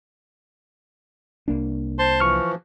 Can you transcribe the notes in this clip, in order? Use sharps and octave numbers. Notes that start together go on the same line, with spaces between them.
C2 A#3 D4
C5 A5 C6
E3 F3 C#6 F6